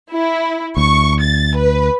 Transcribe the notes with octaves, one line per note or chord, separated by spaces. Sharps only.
E4
D2 C#6
A6
B4